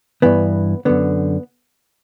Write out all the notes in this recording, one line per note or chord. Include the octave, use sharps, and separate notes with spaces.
G2 E3 B3
F#2 D3 B3